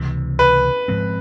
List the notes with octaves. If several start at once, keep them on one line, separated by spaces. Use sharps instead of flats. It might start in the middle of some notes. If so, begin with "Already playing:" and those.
Already playing: C#2 C3 E3
B4
G#2 F3 G#3 C4